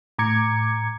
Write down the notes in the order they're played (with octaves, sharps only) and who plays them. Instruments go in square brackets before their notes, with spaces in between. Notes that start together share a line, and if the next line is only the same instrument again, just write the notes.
[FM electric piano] A2 A#5 D6 G#6 C#7